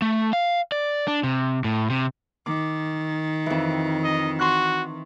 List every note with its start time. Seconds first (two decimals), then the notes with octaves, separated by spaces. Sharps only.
0.02 A3
0.33 F5
0.72 D5
1.08 D4
1.24 C3
1.64 A2
1.90 C3
2.46 D#3 D6
3.46 F2 E3
4.03 D#5
4.39 F#4 C6 C#6 F#6